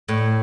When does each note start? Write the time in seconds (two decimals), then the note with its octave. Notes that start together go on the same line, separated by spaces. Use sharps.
0.08 A2